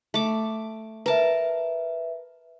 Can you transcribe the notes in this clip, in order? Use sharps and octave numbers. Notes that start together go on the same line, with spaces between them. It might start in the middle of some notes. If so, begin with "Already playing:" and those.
A3 D6
A#4 B4 E5 A5